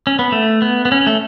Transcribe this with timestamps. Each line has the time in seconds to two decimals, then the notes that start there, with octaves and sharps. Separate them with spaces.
0.07 C#4
0.19 B3
0.32 A3
0.62 B3
0.85 B3
0.92 C#4
1.07 A3